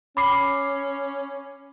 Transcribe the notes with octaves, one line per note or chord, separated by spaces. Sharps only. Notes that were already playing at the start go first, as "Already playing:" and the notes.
C#4 B5 D6 C7